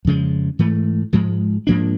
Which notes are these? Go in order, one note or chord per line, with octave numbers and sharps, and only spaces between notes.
F2 C#3 F3 G#3
G#2 E3 A3
G#2 F3 G#3
G#2 F3 A#3 D4